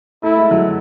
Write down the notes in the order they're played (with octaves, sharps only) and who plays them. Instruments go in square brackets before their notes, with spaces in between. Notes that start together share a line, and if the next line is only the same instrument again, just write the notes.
[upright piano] A3 [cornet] E4
[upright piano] G#3
F#3
G#3